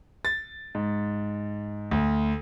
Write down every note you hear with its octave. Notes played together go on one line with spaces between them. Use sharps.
A6
G#2
D2